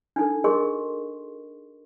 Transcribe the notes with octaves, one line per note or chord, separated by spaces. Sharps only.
D4 D#4 A4
F#4 G#4 A#4 D#5 C6 C#6